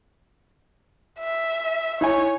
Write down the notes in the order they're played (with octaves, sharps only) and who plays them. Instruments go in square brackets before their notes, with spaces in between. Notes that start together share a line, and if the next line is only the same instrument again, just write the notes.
[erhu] E5
[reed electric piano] D#4 E4 G#5 [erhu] C#5